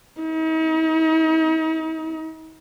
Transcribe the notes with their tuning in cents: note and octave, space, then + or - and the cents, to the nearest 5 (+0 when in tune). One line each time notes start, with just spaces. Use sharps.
D#4 +45